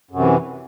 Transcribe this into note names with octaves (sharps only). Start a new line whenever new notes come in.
F#2 C3 E3